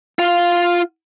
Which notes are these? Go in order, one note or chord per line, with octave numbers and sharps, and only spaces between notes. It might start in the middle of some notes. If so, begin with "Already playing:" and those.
F4 F5